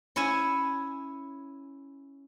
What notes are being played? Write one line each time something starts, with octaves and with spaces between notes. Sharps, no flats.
C#4 E4 C#5 E5 G#5